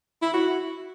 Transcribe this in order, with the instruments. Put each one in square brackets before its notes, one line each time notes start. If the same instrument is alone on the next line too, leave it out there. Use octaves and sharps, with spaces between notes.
[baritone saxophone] E4
F#4